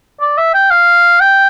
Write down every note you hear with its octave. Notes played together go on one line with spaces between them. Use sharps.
D5
E5
G5
F5
G5